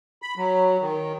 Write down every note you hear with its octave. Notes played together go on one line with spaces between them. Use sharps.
B5
F#3
D#3